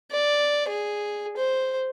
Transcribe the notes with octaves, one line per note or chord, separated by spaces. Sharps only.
D5
G#4
C5